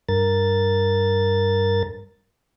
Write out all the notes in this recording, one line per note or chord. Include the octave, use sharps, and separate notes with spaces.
G2 A#4 A6